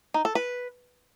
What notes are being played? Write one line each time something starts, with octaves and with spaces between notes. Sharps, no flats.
D#4
A4
B4